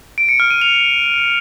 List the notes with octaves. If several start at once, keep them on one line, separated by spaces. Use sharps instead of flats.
D7
C#7
F6
D#7
F7